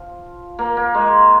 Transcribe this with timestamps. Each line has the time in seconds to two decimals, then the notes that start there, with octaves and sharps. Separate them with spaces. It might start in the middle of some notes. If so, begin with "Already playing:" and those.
Already playing: F3
0.59 A#3
0.77 A#3
0.94 G#3